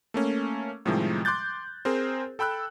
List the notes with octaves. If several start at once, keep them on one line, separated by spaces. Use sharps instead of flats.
A3 A#3 C#4
A2 C3 D#3 F3 G3 G#3
C6 D6 F#6 G6 A6
C4 G#4 A#4 C5
A4 G5 B5 E6 F#6